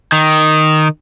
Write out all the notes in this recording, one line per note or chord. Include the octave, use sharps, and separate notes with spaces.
D#3